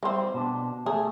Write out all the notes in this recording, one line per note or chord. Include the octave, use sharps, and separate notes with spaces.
E3 G3 C4 C5
B2 D4
A3 G#4